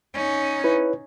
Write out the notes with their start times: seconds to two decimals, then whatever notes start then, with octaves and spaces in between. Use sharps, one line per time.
0.14 C#4 D#4
0.64 E4 B4 C#5